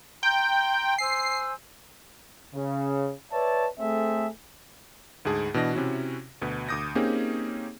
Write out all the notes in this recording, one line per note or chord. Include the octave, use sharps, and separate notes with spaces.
G5 A#5 C6
C5 G#5 E6 C7
C#3
B4 C#5 D5 E5 A5
A3 C4 G#4 A4 E5
D2 G#2 G#4 A5
B2 E3 D4 D#5 A#6
C3 C#4 E4 F#4
D2 B2 B4
D2 D6 D#6 G6 A#6
A#3 C4 C#4 D#4 G4 G#4